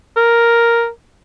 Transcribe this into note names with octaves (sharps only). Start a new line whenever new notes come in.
A#4